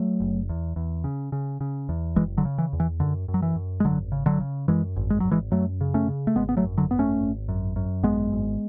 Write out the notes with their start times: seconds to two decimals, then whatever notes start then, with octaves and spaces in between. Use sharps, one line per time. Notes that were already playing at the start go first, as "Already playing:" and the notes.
Already playing: F#3 A3
0.20 F#1
0.49 E2
0.76 E2
1.04 C#3
1.32 C#3
1.61 C#3
1.89 E2
2.16 F#1 E3 G#3
2.38 D3 F#3
2.45 C#3
2.58 E3
2.73 E2
2.80 E3
3.00 F#2 D3
3.28 F#2
3.34 F#3
3.42 E3
3.56 F#2
3.80 G#3
3.84 G#1 D3 F#3
4.12 C#3
4.26 D3 F#3
4.41 C#3
4.68 F#2 E3 G#3
4.96 G#1
5.10 G#3
5.20 G#1 F#3
5.31 E3 G#3
5.52 F#2 F#3 A3
5.81 C#3
5.94 A3 C#4
6.08 C#3
6.27 A3
6.36 G#1 G#3 B3
6.49 B3
6.57 F#3 A3
6.64 F#2
6.78 D3 F#3
6.91 G#1 B3
6.99 A3 C#4
7.20 G#1
7.49 F#2
7.76 F#2
8.03 G#1 G#3 B3
8.32 G#1